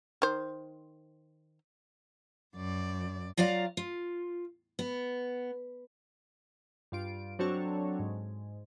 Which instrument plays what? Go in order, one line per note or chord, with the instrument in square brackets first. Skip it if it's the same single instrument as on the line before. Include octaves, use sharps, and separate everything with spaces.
[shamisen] D#3 C5
[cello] F#2 D5
[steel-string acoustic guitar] F#3 F4 D5 F5 A#5
F4
B3
[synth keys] G2 F4 D7
F#3 C4 D4 F#4 A4 C#5
G#2